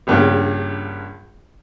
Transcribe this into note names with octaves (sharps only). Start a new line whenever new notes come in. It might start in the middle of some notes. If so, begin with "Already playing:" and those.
A#1 G2 C#3